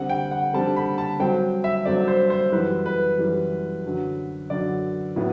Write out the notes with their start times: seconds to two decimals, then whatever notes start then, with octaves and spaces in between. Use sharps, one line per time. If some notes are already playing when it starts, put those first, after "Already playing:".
Already playing: D3 G3 C4 F#5
0.10 G5
0.31 F#5
0.54 D3 G3 C4 A5
0.76 B5
0.98 A5
1.20 G2 F#3 C4 G5
1.64 E5
1.85 G2 F#3 C4 D5
2.08 C5
2.30 C5
2.52 F#2 E3 G3 B4
2.86 B4
3.18 F#2 E3 G3
3.84 F#2 D3 F#3
4.50 F#2 D3 F#3 D5
5.16 A2 F#3 B3